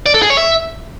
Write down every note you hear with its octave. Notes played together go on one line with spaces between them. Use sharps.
D5
A4
G#4
C#5
E5